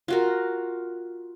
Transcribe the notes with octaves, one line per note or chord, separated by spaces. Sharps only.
F4 F#4 A#4